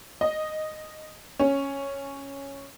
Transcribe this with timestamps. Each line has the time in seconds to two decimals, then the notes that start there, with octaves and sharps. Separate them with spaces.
0.21 D#5
1.39 C#4